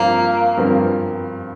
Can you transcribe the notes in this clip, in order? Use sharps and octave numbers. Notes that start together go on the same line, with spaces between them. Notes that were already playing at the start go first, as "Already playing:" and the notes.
Already playing: G2 F3 A#3 C4 F4 A#4
G2 F3 C4 F4 A#4